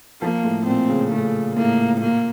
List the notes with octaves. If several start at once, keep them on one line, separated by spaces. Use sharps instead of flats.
F3 A#3
A2
A#2 C4
C#3
C#3 A3
A2 A#3
A#2 A#3